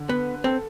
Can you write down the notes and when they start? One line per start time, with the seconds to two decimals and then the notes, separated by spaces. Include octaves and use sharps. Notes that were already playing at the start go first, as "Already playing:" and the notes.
Already playing: D3
0.09 B3 B4
0.44 C4 A4